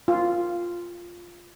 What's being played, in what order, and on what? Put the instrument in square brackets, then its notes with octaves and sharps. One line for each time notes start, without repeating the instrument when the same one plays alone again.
[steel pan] F4